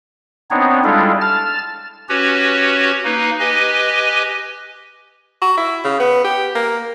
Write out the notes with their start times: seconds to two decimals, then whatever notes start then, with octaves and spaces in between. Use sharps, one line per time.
0.51 B3 C4 D4 D#4 C#5
0.84 G3 G#3 D4 E4 F4 A4
1.21 A5 F6 A6
2.09 C#4 F#4 G4 B4 C#5
3.05 A#3 D#4 B4
3.40 G4 B4 D#5 G#5
5.42 F#4
5.57 E4
5.84 C#3
6.00 B3
6.24 G4
6.55 A#3